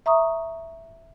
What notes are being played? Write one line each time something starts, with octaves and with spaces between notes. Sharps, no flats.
E5 A#5 C#6 D#6